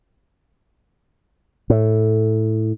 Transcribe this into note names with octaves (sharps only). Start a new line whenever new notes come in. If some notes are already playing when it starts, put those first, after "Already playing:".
A2